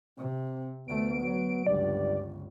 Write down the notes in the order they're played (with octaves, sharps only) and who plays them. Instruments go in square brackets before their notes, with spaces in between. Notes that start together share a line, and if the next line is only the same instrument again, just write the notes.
[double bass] C3 [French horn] C4
[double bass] D2 A3 [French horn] B3 [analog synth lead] D7
[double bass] F#3
[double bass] G1 C#2 [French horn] G2 [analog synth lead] D5